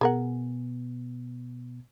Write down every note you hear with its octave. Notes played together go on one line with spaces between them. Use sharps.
B2 B3 G#4 A#4 F#5